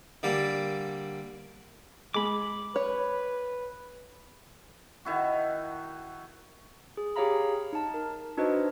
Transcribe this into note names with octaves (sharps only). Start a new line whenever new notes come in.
D3 G3 A#3
G#3 B5 D6
B4 C#5
D#3 E4 F#4
G#4
G4 G#4 C#5 F5 A#5 B5
D#4 A5
A#4
D4 D#4 F#4 B4 C5 D#5